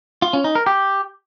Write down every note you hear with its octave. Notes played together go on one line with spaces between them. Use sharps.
F4
C#4
D#4
A#4
G4